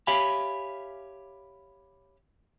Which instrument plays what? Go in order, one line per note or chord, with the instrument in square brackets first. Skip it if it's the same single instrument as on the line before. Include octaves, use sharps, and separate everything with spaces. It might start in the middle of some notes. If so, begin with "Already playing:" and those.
[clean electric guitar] G4 C#5 E5 F5 G#5 B5